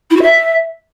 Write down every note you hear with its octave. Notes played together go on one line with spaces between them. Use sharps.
E4
F#4
E5